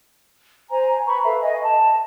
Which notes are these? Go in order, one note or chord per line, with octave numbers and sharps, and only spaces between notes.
C5 G#5 A#5
B4 B5 C#6
A4 B4 E5 F5
D#5 G#5
A5